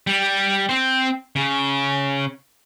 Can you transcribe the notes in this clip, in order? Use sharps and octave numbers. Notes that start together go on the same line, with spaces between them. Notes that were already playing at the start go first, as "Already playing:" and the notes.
G3
C4 C5
C#3